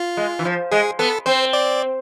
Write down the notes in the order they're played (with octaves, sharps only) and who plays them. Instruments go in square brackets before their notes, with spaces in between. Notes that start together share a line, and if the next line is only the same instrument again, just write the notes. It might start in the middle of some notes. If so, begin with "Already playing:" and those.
Already playing: [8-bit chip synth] F4
[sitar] G#3
E3
F3
[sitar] G#3 [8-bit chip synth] G#4
[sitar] B3 [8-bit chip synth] A4
[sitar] C4 [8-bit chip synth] C5
[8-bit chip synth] D5